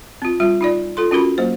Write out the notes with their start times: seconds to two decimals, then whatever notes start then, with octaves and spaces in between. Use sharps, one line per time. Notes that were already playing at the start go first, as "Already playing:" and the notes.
0.22 C4 F4
0.40 G3 F4
0.61 D#4 F4 D5
0.97 F4 A4 C6
1.11 C#4 F4 F#4 A#4 B5
1.38 F#3 A#3 C5